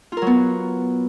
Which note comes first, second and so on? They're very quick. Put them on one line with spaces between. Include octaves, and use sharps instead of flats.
F4 A#4 F#3 B3